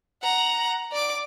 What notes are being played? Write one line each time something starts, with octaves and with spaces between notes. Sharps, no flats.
F#5 A#5
D5 D6